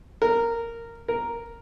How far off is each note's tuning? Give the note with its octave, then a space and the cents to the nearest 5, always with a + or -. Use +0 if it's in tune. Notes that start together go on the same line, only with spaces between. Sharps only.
A#4 -10
A#4 +0